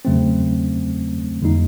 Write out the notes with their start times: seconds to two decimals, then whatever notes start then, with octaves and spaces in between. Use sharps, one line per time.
0.05 E2 C#3 F#3 A3 C4
1.42 F2 D3 G3 A#3 D#4